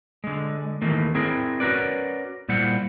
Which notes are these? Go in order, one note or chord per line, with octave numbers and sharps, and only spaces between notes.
D3 G#3
D#3 E3 A3 A#3
C4 E4 G#4 A#4
C#4 F#4 A#4 B4 D5
A#2 G3 E4 C5 F#5